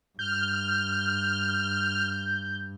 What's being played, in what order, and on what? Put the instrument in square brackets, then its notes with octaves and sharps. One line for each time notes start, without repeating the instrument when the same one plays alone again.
[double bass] G2 [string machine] F6 [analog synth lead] G6